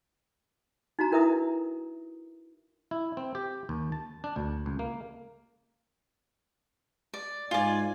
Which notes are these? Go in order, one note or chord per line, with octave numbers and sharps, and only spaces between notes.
D#4 F#4 A#5
D4 E4 A#4 B4 E5 D#6
E4
C4
G4
D#2
A5
D4
D2
C#2
A#3
D5
G#2 F4 D5 G#5